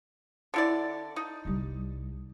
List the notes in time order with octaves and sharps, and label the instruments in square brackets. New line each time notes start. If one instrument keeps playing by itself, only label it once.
[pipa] D3 E4 D5
D#4
[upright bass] C2 G3